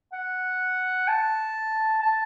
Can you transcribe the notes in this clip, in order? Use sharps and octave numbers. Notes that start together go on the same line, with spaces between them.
F#5
A5
A5